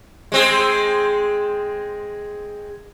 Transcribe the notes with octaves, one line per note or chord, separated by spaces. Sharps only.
G#3 C4 G#4